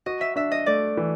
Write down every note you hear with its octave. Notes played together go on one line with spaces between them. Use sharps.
F#4 D#5
E5
D4 E5
D#5
A3 D5
E3